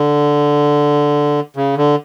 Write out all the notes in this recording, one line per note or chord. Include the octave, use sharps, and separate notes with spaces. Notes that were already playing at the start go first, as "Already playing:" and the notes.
Already playing: D3
C#3
D3